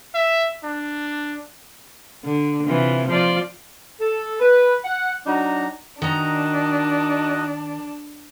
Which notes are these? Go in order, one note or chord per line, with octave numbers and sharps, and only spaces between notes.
E5
D4
D3
C3 E3 F4
F3 F4 D5
A4
B4
F#5
F#3 D4 D#4 F#4 A#5
D#3 D4 D#4 F#4 D#5 A#5